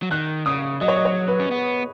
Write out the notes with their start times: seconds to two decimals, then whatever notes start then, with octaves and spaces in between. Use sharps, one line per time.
0.02 F#3
0.11 D#3 F#6
0.46 C#3 D#6
0.81 F#3 D#5
0.88 C#5
0.96 D#5
1.05 C#5
1.28 B4
1.40 C#4
1.51 B3